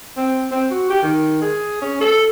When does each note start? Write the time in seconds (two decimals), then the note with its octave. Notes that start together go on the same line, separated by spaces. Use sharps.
0.17 C4
0.52 C4
0.71 F#4
0.90 G4
1.03 D#3
1.42 G#4
1.82 C#4
2.01 A4